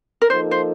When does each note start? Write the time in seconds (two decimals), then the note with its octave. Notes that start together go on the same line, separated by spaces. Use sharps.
0.22 A#4
0.30 F3 A#3 D#4 A4 C5
0.51 C5